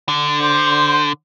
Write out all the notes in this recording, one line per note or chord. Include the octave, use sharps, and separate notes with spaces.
D3
C5